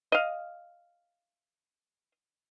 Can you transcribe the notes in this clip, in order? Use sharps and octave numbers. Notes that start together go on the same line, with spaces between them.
D#5 F5